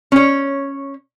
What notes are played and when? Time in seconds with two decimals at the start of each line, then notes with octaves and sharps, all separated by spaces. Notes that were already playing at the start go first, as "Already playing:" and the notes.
0.12 C#4 C#5